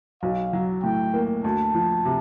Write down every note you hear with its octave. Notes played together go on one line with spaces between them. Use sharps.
B1 F5
F#3
A2 G5
A#3
D2 A5
F3
C3